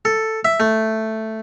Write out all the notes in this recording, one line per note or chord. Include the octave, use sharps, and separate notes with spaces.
A4
E5
A3